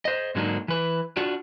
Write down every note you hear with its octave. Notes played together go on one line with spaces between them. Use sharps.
C5 D#5
G#2 D3 F#3 A#3 D4 D#4
E3 B4
D4 F4 F#4